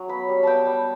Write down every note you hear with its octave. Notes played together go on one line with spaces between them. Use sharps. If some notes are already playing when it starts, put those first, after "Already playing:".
Already playing: F#3 C#4
B3 B5
G3
B3 G5 A5
G3